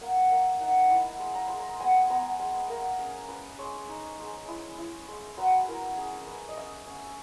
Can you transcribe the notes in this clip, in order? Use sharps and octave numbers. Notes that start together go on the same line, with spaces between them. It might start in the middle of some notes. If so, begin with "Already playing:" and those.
A#3 F#5
A#3 E5
D#4 F#5
E4 F#5
G#3
A#5
G#3 B5
A#5
B3 G#5
B3 A#5
G#3 G#5
A#3 A#4
C#4 G#4
C#4 B4
G#3 C#5
D#4
G#3
E4
E4
G#3
F#3 B4
E4 A#4
C#4 G#4
C#4 B4
D#5
C#4 E5
C#4